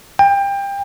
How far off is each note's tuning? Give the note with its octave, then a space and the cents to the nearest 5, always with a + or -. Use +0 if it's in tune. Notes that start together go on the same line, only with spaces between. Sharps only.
G5 +25